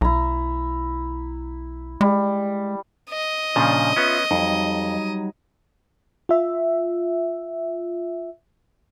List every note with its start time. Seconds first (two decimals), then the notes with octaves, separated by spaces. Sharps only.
0.01 B1 E4 A#5
2.01 G3 G#3
3.10 D#5
3.56 A#2 C#3 F3 C#4 D4 A5
3.96 B3 C#4 F4 E5 F5
4.31 F2 F#3 G3 D#4
6.29 F4 E5